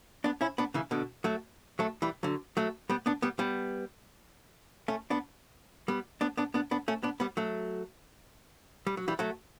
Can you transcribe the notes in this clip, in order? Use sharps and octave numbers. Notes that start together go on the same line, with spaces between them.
B3 D4
C#4 E4
B3 D4
C#3 E3
B2 D3
F#3 A3
F#3 A3
E3 G3
D3 F#3
F#3 A3
G3 B3
B3 D4
G3 B3
G3 B3
A3 C#4
B3 D4
G3 B3
B3 D4
B3 D4
B3 D4
B3 D4
A3 C#4
B3 D4
G3 B3
F#3 A3
G3
F#3
E3 G3
F#3 A3